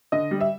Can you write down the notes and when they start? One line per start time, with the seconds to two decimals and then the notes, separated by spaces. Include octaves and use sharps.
0.12 D3 D#5
0.31 G3
0.40 E5